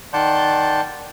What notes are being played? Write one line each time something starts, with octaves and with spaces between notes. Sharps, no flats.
D#3 D5 F#5 A5 C6 G6